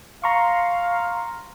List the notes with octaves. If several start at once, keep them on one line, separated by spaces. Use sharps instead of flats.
F5 A#5 C6 C#6